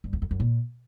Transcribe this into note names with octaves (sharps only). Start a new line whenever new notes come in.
G2
E2
F2
F#2
A#2